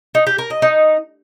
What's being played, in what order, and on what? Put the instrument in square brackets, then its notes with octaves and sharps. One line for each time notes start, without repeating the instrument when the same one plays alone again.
[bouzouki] D#4
G4
A#4
D#5
D#4